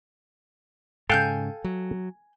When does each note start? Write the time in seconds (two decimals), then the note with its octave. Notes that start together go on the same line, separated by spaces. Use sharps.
1.10 G#2 C#3 A4 F5 G5 G#5 F#6 G6
1.64 F#3